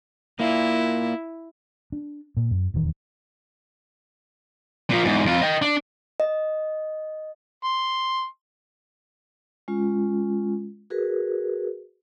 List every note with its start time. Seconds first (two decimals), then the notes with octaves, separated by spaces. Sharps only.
0.40 A#3 E4 F4
1.92 D4
2.37 A#2
2.51 F#2
2.74 D#1 E2 D#3
4.90 A#2 F3
5.04 E2 G#2
5.26 F2 F4
5.41 D#5 G5
5.62 D4
6.20 D#5
7.64 C6
9.68 G#3 C#4 F4
10.90 F#4 G#4 A#4 B4